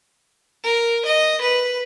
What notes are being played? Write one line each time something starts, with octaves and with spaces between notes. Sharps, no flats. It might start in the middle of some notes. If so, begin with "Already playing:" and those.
A#4
D#5
B4